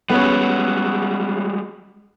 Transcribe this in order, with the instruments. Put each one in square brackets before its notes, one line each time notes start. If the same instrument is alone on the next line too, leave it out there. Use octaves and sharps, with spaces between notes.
[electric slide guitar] G3 G#3 F#4 [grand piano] B3 C#4